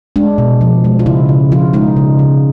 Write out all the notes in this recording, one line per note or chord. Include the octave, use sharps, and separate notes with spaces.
G#3 D4
B2
F3
G#3
F4
C#3 E4
C#3
F3 F4
G#3 D#4
C#3
C#3